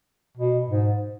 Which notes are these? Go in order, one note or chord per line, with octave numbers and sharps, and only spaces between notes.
B2
G#2